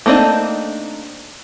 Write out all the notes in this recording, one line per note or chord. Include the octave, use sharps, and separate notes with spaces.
A3 A#3 C4 D4 D#4